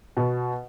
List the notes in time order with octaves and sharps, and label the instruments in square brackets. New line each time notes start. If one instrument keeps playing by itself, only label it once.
[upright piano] B2